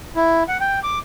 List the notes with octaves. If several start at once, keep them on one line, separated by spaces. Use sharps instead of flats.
E4
F#5
G5
D6